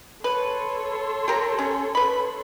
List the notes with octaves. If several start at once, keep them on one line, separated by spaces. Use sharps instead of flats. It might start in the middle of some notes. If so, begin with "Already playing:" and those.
A4 B4 C#5 C6
G4 A#4 A#5
C#4
B4 B5